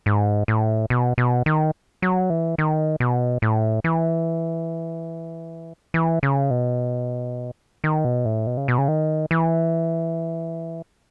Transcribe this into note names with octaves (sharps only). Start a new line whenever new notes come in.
G#2
A2
B2
B2
D#3
F#3
E3
D#3
B2
A2
E3
E3
C#3
B2
D#3
B2
A2
B2
C#3
B2
C#3
D#3
E3